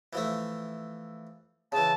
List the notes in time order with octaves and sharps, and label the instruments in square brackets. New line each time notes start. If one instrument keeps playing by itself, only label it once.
[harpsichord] E3 F3 A3
[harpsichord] C#3 E3 [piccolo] A5